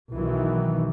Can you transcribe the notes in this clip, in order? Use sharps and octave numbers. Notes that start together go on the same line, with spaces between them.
B1 D#3 E3